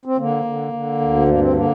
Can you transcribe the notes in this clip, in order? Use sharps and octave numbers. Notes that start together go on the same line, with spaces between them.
C4
D3 A#3
D3
D3
D2
G2 A#3
C4
D3 A#3